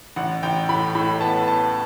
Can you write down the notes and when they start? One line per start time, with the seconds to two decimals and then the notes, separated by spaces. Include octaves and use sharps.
0.16 A1 F#5
0.43 A1 G5
0.69 A2 B5
0.95 A2 B5
1.21 B3 A5
1.47 B3 A5